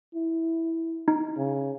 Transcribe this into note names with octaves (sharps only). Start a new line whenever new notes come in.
E4
D#4
C#3